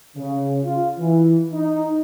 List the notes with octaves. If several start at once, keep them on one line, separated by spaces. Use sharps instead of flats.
C#3
F4
E3
D#4